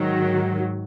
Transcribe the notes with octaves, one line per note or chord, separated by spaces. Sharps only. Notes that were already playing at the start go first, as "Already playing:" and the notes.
Already playing: G#2 D#3 F#3